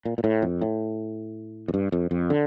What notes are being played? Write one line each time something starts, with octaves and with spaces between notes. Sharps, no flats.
A#2
A#2
A2
F2
A2
F2
G2
F2
F2
D3